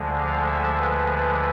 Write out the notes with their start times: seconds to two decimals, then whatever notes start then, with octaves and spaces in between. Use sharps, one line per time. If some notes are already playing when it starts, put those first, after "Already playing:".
Already playing: D2 D3 F3 G#3
0.18 F5
0.48 E5
0.78 B4